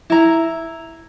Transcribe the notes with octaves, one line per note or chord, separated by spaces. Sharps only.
E4 A#5